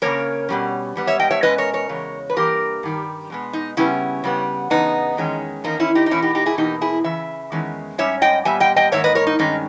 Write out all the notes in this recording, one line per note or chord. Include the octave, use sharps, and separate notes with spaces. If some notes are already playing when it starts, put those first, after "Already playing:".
C#3 E3 A#3 C#4 A#4 C#5
B2 G3 C#4
G#2 G3 B3
C#5 E5
D#5 G5
C#5 E5
B2 G#3 C#4 B4 D#5
A#4 C#5
A#4 C#5
E2 C#3 G#3
B4
G2 E3 A#3 G4 A#4
G2 D#3 G3
B2 G#3 B3
D#4
C#3 G3 B3 C#4 E4
C#3 G3 B3
E2 C#3 B3 D#4
E2 D#3 G#3 C#4
E2 D#3 A#3 C#4 D#4
C#4 E4
D#4 G4
D#4
E2 B2 A#3 C#4 E4
D#4 G4
D#4 G4
E4 G#4
E2 B2 A#3 D#4 G4
E4 G#4
C#3 E3 E5
E2 D#3 G#3 C#4
G#2 G3 C#4 C#5 E5
D#5 G5
A#2 G3 B3 E5 G#5
D#5 G5
D#5 G5
G#2 D#3 A#3 C#5 E5
B4 D#5
A#4 C#5
D#4
G2 D#3 G#3 C#4 D#4